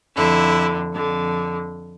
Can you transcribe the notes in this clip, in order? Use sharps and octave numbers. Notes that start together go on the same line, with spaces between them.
F2 D3 E4
F2 D3